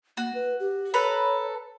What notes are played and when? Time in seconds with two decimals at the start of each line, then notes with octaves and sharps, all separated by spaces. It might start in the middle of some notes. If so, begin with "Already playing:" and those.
0.17 A#3 F#4
0.35 B4
0.60 G4
0.94 A4 B4 C#5 A#5